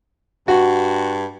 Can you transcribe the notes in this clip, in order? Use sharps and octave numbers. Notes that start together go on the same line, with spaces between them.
G2 F#4